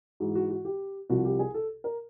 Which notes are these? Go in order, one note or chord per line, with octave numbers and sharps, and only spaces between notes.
G#2 E3 F#4
F#4
F#4
G4
C2 C3 F3 F#4
G4
G#4
A4
A#4